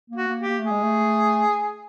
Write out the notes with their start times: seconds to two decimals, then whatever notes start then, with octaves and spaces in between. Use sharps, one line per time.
0.10 A#3
0.15 F#4
0.27 A#3
0.41 G4
0.47 A#3
0.59 A3
0.66 G#4
0.71 G#3
0.83 A3